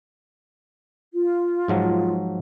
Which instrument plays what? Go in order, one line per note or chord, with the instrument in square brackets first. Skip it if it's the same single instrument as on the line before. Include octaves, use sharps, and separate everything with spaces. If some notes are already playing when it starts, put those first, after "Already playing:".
[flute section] F4
[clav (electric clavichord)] G#2 F3 F#3